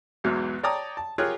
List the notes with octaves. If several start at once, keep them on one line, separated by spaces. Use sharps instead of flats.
B1 E2 G#2 F#3 E5 F6
C#5 D5 G5 A5 A#5 D#6
A5
F4 G4 G#4 A#4 C#5 F#6